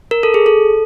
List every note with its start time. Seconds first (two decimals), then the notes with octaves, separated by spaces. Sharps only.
0.11 A#4
0.23 A4
0.34 G#4
0.46 A4